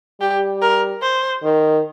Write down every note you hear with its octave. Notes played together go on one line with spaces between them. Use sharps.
G3 G4
A#4
C5
D#3